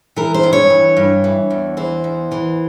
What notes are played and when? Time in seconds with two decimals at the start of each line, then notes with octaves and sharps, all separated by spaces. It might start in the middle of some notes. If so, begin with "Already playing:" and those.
0.16 E3 A#4
0.34 C5
0.43 G2
0.53 C#5
0.70 E3
0.97 G2
1.24 E3
1.51 E2
1.77 E3 C5
2.04 E2
2.31 E3